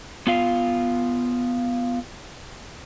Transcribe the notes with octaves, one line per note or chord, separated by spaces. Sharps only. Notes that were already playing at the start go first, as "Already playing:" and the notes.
B3 F4 F5